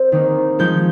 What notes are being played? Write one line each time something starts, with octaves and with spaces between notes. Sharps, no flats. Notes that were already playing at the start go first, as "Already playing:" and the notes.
Already playing: C4
D#3 A#3 D#4
F3 G#3 D#4 G6